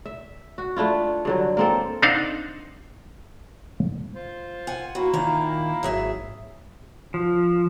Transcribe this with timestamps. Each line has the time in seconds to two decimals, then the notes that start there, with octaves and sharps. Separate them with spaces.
0.06 E5
0.58 F#4
0.76 A3 D4 E4 F4
1.25 G2 D3 F#3
1.57 A#3 C4 A4
2.02 C4 D4 D#4 C5 F5 F#5
4.15 F4 C5
4.67 F#5 G#5
4.95 A#3 E4 F#4
5.13 A#2 D#3 A#5
5.83 G#1 F#3 G#4 E5
7.14 F3